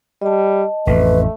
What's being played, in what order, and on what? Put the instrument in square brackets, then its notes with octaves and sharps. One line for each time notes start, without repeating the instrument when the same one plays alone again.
[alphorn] G3 [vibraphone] D#5 A5
[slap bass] A1 F2 [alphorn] A3 [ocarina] B4